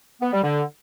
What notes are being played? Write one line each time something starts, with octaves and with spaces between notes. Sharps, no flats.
B3
G3
D3